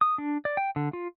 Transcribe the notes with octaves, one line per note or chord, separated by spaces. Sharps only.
D#6
D4
D5
G5
D3
F4